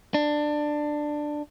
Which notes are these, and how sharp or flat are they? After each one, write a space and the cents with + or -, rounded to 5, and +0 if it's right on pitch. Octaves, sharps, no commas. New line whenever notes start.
D4 +15